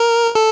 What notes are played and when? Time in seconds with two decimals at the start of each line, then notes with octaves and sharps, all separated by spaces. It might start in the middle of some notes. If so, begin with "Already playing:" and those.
Already playing: A#4
0.35 A4